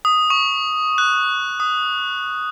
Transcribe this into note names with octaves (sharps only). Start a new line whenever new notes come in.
D#6
C#6
F#6
D#6